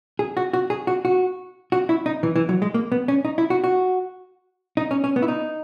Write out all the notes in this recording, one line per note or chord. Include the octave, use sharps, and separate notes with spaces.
G#4
F#4
F#4
G#4
F#4
F#4
F#4
E4
D#4
E3
E3
F#3
G#3
A#3
B3
C#4
D#4
E4
F#4
F#4
D#4
C#4
C#4
B3
E4
D#4